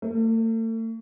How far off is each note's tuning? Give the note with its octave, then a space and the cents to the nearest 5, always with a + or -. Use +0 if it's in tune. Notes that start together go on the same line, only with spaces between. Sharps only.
A3 +40